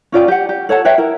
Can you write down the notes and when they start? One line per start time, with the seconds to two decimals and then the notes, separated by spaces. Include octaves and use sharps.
0.12 C#4 F4 D5 G5
0.28 G4 F#5
0.49 G4
0.69 A4 C#5 F#5 A5
0.85 B4 C#5 E5 G5
0.98 E4 A#4